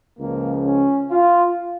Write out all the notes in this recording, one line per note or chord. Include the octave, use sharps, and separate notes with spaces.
C#2 C#3 F3 A#3
C#4
F4